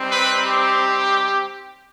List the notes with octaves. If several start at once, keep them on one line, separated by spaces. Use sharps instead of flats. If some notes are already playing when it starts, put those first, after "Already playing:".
Already playing: G3 C4 D#4
B4
G4